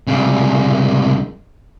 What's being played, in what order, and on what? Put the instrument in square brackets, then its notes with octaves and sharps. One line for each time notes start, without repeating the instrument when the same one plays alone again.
[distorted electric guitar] C2 C#3